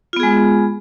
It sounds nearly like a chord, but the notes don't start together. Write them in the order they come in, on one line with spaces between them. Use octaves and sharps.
F4 B3 G#4 G#3